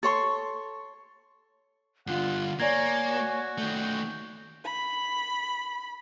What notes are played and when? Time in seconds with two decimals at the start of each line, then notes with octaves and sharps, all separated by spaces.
0.03 A4 C#5 C6 C#6
2.07 G2 D3 F4 F#5
2.60 A#3 C#5 D5 G#5 A#5 C#6 G#6
3.10 F#4
3.58 D#3 A3 G6
4.65 B5